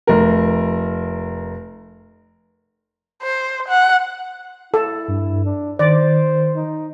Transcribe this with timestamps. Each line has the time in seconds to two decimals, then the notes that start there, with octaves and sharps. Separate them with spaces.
0.07 F1 A#4
3.22 C5
3.68 F#5
4.74 E4 A4
5.08 G2
5.45 D4
5.79 D#3 C5 D5
6.56 D#4